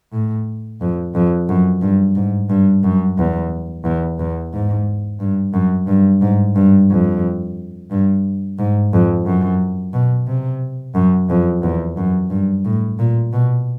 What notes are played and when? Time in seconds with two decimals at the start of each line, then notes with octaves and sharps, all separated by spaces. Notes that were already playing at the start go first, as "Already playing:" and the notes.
0.12 A2
0.81 F2
1.15 F2
1.49 F#2
1.81 G2
2.15 G#2
2.49 G2
2.83 F#2
3.18 E2
3.85 E2
4.19 E2
4.53 G#2
5.20 G2
5.54 F#2
5.88 G2
6.21 G#2
6.56 G2
6.90 F2
7.91 G2
8.59 G#2
8.93 F2
9.26 F#2
9.93 B2
10.27 C3
10.95 F#2
11.30 F2
11.63 E2
11.97 F#2
12.30 G2
12.65 A2
12.99 A#2
13.33 B2